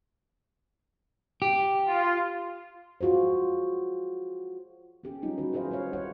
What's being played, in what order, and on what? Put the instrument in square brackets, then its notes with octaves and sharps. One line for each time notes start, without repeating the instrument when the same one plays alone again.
[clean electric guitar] G4
[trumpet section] F4
[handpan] F4 F#4 G#4 C5
B3 C#4 G4 G#4
F#3 G3 C#4 D#4 F4
D#3 B3 F#4 B4
E4 G#4 B4 C5 D#5 F5
D#3 G3 F4 B4 C#5 F5
E4 G4 C5 C#5 F#5